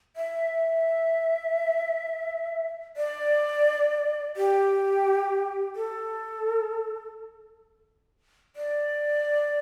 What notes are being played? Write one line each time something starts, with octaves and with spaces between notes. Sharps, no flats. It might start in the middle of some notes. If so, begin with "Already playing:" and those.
E5
D5
G4
A4
D5